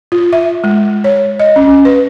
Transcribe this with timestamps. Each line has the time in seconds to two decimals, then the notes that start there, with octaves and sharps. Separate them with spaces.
0.12 F4
0.33 E5
0.64 G#3
1.04 C#5
1.40 D#5
1.56 C#4
1.68 C#4
1.85 B4